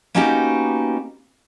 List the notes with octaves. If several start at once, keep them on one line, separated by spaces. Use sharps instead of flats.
A#3 B3 C#4 D#4 F#4 G4